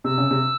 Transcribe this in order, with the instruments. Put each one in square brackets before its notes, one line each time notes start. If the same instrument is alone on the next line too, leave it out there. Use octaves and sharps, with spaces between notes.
[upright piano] C3 [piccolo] E6
[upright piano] C#3
C3